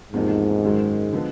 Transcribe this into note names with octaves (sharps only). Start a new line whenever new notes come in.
E2 G#2 C3 F3 A#3 D#4
F#2 D#3 G#3
D3 F3 G#3 B3